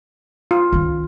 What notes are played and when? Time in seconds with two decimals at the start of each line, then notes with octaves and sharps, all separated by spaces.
0.51 F4
0.73 C#2 D#3